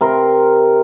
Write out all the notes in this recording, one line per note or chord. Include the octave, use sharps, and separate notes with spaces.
C3 A#4 C6